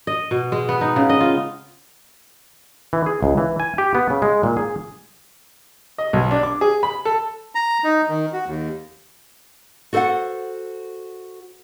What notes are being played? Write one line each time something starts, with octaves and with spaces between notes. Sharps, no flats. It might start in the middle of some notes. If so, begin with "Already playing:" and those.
D#5
B2
G#3
B3
D#4
C#3
D#5
F4
E3
G#4
C#2
E3
G#5
G4
B3
C#3
G#3
A#2
G#4
D#5
B1
D4
D6
G#4
B5
A4
A#5
D#4
D#3
F#4
D#2
F#4 A4 C5 F5 F#5